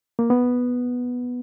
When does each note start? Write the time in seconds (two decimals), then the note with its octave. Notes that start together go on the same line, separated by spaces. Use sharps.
0.19 A#3
0.30 B3